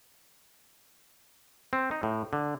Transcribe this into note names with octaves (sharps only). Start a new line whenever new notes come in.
C4
D#4
A2
D3